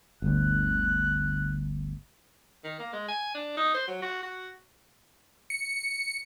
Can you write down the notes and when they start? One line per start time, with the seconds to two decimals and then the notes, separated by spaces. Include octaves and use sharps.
0.22 G1 D2 F#6
2.64 D#3
2.79 A#3
2.93 G#3
3.08 G#5
3.34 D4
3.57 D#4
3.74 C5
3.88 F#3
4.02 F#4
4.23 F#4
5.50 C#7